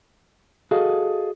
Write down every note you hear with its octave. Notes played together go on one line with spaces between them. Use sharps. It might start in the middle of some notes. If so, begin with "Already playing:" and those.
F#4 G#4 A4 D#5 F5